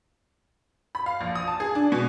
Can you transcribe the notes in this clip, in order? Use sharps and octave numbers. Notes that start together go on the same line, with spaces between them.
B5
F5
A#1
D#6
A5
G#4
D4
B2